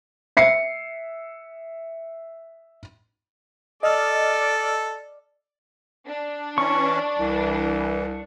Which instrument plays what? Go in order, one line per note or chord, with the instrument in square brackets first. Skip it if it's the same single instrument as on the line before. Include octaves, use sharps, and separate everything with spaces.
[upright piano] E5 C7 C#7
[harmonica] A4 [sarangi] D5 [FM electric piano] D#5 E6 F6
[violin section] D4
[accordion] E3 C#4 [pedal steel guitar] C#6
[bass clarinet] C2 [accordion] E3